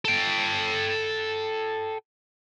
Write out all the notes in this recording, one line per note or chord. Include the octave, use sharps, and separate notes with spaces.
A4 G5